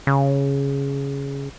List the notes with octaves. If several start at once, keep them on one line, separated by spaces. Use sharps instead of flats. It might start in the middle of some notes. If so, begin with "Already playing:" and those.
C#3